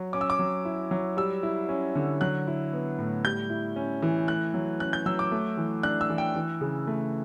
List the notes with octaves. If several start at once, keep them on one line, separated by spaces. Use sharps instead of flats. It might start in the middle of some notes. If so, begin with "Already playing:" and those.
Already playing: F#3
C#4 D6
E6
D6
F#3
E4
F#3
G3 E6
E4
C#4
D3
F#3 F#6
E4
B3
A2
G3 G6
E4
C#4
E3
A3 F#6
F#3
C#4 F#6
G6
F#3 E6
D6
A3
E3
D4 F#6
E6
E3
G5
E3
C#3
A3